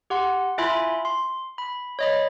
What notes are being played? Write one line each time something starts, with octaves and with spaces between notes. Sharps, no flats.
G4 F#5 C6
E4 F4 E5 G#5 B5 C6
C6
B5
C#5 D#5 B5